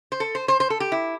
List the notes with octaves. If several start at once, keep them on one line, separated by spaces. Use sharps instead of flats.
C5
A4
C5
C5
C5
A4
G4
E4